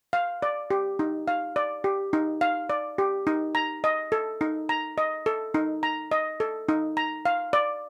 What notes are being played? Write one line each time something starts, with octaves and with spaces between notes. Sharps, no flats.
F5
D5
G4
D#4
F5
D5
G4
D#4
F5
D5
G4
D#4
A#5
D#5
A4
D#4
A#5
D#5
A4
D#4
A#5
D#5
A4
D#4
A#5
F5
D5